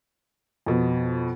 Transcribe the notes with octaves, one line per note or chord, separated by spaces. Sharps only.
F2 B2